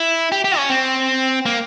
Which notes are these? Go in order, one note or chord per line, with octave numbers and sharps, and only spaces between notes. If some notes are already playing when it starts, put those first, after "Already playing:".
Already playing: E4
G4
G4
C#4
C4
A#3